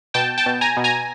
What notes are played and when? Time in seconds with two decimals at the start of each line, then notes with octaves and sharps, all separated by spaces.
0.14 B2 G5 A5
0.38 G5 A5
0.46 B2
0.61 G#5 A#5
0.77 B2
0.84 G#5 A#5